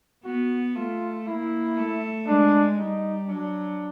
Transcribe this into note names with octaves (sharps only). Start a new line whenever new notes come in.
B3 F#4
A3 F4
A#3 E4
A3
G#3 D4
G3 D#4
F#3 D4